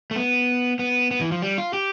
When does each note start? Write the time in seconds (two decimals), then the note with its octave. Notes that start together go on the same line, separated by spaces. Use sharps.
0.11 A3
0.16 B3
0.79 B3
1.11 B3
1.21 E3
1.32 F3
1.42 G3
1.58 F4
1.74 G4